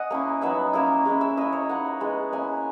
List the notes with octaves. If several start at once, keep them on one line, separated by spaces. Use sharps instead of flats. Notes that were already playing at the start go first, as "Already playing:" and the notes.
Already playing: D#5 F#5 G#5
A#3 C#4 E4
F#3 B3 D#4 E5
A#3 C#4 E4
G#3 C#4 E4
E5
A#3 E4 D#5
C#5
A#3 D#4 F#5
G#3 B3 E4
A#3 C#4 E4 G#5